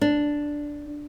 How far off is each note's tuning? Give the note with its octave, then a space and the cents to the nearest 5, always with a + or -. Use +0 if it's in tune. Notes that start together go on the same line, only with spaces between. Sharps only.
D4 +0